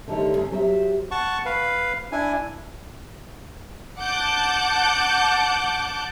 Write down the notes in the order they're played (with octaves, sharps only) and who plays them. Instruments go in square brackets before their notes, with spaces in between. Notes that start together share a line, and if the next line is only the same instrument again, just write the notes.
[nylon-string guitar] D3 D#3 A3 G4 C5 C#5
C#3 C#4
F#3 G4 C5 C#5 E5
[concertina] F#5 A5 C#6
B4 F5
D4 E4 G#5
[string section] F#5 A5 D6 G6